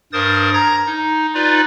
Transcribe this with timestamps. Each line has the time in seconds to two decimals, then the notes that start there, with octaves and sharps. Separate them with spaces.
0.13 G2 A#4 C5 D#6 A6
0.54 A#5 G#6 A#6
0.87 D#4
1.34 D#4 F4 B4 D5